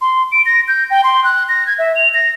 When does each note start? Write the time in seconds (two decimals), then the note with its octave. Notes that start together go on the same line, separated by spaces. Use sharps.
0.01 C6
0.32 D7
0.46 A#6
0.68 G6
0.90 G5
1.04 C6
1.24 F#6
1.49 A#6
1.67 G#6
1.79 E5
1.96 F7
2.14 A#6